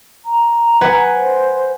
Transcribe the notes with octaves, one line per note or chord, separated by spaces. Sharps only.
A#5
B4 F#5 G#5
C5